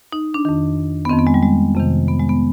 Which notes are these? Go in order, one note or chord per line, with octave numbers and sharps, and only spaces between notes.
D#4
D4
F2 D#3
B3
F2 D#3 C4
B3
G#3
G3
G#3
F2 C3 D#3
B3
G#3
B3